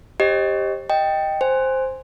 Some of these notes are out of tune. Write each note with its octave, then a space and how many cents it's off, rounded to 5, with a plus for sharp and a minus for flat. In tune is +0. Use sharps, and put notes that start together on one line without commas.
G4 +10 C5 +35 D#5 +0
D#5 +0 G5 +0
C5 +0 G#5 -15